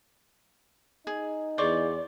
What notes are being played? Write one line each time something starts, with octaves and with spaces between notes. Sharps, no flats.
D#4 G#4
E2 G#4 C5 D5 C#6 D6